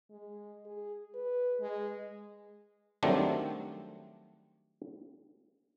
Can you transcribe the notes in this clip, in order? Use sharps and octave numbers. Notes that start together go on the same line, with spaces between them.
G#3
G#4
B4
G#3
D#3 F#3 G3 A3 C4 D4